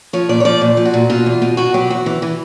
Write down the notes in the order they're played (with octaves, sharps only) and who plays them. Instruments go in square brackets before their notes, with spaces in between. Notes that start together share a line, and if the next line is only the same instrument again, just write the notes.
[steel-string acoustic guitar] F3 C#5
A#2 D5
C#5
F3 D5
A#2
F3
F#4
A#2
B2 F4
E2
B2
B2 F#4
F#3 G4
E2 F#4
E3
E3